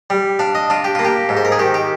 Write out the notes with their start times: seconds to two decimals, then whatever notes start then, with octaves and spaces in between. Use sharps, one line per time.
0.10 G3
0.39 D4 F5
0.55 D#5
0.70 D4 F4
0.84 G4
0.95 A#3 F4
1.05 G4
1.29 G#2
1.37 C5
1.45 A#4
1.52 G#4
1.59 D#3 G4
1.74 G4